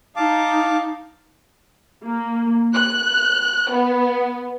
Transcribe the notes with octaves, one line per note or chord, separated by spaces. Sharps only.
D#4 F5 A5 D6
A#3
F#6
B3